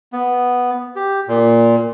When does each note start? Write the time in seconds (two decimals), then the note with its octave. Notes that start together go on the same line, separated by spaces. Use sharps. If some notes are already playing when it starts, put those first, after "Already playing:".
0.13 B3
0.96 G4
1.28 A#2